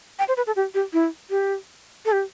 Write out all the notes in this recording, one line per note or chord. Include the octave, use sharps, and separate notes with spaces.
G5
C5
B4
A4
G4
G4
E4
G4
A4
G4